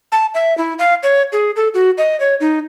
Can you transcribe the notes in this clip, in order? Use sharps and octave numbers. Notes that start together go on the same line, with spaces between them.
A5
E5
E4
F5
C#5
G#4
A4
F#4
D#5
C#5
D#4